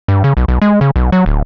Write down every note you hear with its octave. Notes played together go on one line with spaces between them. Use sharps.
G2
C#3
B1
B1
G#3
C#3
B1
F#3
D1